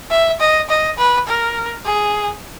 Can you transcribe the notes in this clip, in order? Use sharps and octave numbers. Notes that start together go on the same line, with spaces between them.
E5
D#5
D#5
B4
A#4
G#4